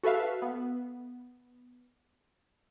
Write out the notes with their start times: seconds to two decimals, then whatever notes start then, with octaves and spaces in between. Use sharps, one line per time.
0.03 F#4 A4 B4 E5 F5
0.42 B3